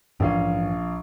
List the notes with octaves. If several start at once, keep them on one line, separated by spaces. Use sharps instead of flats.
A#1 G#2 E3 C#4 F5